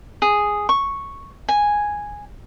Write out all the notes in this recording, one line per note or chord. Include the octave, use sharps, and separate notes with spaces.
G#4
C#6
G#5